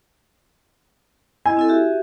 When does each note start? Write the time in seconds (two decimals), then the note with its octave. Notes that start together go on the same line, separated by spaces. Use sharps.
1.46 E4 D#5 G#5
1.57 C4 E4 A4
1.68 F#4 G4 E5